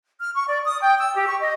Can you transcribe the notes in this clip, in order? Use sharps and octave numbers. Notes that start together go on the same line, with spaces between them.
F6
C#6
D5
D#6
G5
E6
G4
C#6
D#5